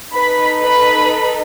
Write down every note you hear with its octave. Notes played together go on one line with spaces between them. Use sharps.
D#4 A4 B4 B5
B4 B5